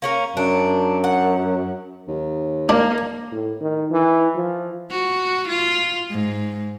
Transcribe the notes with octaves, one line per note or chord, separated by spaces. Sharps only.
A#3 C#4 A#4
F#2 D4
F#5
D#2
A#3 D4
A2
D#3
E3
F3
F#4
F4
G#2